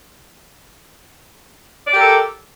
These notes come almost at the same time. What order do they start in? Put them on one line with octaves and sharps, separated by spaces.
D5 G4 A#4 A4